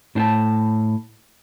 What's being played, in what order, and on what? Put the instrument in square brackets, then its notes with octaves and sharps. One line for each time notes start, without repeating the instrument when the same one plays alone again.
[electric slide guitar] A2 D4 C5 F5 G5 A5